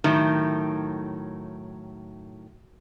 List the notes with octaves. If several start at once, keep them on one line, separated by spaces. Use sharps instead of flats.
A2 D#3 F#3